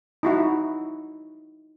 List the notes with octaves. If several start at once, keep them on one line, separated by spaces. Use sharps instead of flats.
D#4 E4 F#4